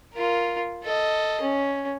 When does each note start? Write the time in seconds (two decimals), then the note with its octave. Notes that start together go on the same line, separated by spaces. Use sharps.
0.14 F4 A#4
0.83 A4 D#5
1.41 C#4